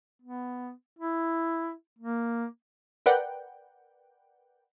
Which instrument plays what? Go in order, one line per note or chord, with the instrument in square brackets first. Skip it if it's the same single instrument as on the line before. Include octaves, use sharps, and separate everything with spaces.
[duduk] B3
E4
A#3
[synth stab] A#4 B4 D5 F#5 G5